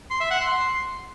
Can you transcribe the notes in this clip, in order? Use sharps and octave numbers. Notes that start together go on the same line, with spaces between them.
C6
E5
F#5
C6